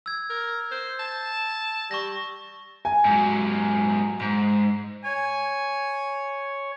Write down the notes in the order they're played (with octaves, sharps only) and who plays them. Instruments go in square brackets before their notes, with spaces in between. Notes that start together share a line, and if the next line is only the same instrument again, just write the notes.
[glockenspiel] E6 G#6
[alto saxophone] A#4
C5
A5
[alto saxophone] G3 [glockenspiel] C#6 A#6
[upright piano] G#5
[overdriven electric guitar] G#2 F#3
G#2
[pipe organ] C#5 [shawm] G#5